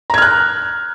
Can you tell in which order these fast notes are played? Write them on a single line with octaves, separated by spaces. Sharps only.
A#5 G#6 F6 F#6